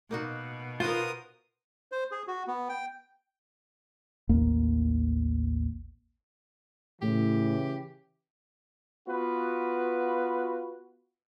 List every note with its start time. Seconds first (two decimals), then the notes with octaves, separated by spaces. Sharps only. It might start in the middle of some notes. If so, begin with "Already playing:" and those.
0.11 B2 A#3 D#4 F#4
0.80 B3 F4 F#4 A#4 C5 D#6
1.92 C5
2.12 G#4
2.27 F#4
2.48 B3
2.69 G5
4.29 A1 D#2 A#3
7.02 A2 C#3 E3 G4
9.08 B3 F4 F#4 B4